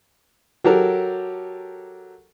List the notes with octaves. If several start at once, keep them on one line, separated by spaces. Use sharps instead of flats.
F#3 G4 A4 A#4